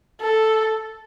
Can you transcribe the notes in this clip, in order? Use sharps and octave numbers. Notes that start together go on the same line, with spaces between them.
A4